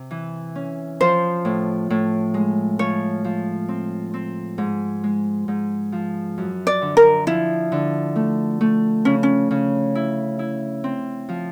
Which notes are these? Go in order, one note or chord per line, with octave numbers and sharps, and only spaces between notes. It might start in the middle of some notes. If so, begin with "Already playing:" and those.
Already playing: C3
E3
C#4
F3 C5
A2
A2
G#3
F3 C#5
F3
C4
C4
G#2
G#3
G#2
F3
F#2
D5
D3
A#4
F3 E4
D3
A3
A3
C#3 C#4
C#4
C#3
E4
E4
C4
F3